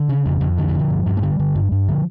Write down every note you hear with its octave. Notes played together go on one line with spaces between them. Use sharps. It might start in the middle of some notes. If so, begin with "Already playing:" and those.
Already playing: D3
C#3
F2
F2
D3 E3
E3
D3 F3
G2
G2
A3
D3 G3
D3
G2
G2
D3 F3